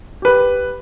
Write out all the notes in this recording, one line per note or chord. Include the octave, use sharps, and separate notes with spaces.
G4 B4